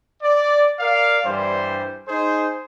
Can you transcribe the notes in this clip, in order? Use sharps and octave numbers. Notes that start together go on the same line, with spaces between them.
D5
A#4 D5 F5
G2 E3 G3 C5
D#4 G#4 C5